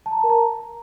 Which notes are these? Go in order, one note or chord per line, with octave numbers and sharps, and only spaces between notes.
A5
A#5
A5
A#4
A#5